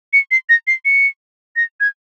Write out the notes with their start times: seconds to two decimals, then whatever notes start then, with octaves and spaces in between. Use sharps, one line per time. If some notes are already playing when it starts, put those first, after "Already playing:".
0.13 C#7
0.31 C7
0.49 A#6
0.67 C7
0.85 C#7
1.56 A#6
1.80 G#6